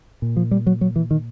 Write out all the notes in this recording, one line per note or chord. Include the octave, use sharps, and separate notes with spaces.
A#2
F3
G3
F#3
F#3
E3
D#3